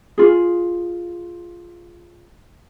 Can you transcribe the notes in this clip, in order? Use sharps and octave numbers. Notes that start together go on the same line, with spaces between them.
F4 G#4